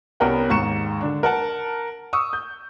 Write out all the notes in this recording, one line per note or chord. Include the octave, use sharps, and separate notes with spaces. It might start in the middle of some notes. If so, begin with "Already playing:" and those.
C2 B3 C#4 A#4 F#5 G5
D#2 G#2 C#6 C#7 E7
D3 D4
A#4 F#5 A5
C#6 D#6 E6
G6